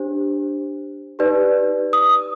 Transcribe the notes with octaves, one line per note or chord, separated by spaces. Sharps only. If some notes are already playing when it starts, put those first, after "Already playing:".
Already playing: D4 G4 C5
D#4 G4 B4 D5
D#6